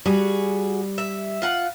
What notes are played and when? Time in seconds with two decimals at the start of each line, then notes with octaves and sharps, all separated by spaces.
0.06 G3 F#4 G#4
0.98 E5
1.42 F4 F#5